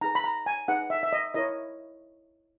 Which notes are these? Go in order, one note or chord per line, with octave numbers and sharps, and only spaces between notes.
D#4 G#4 B4 A#5
B5
A#5
G#5
D#4 G#4 B4 F#5
E5
E5
D#5
E4 A#4 C#5 D#5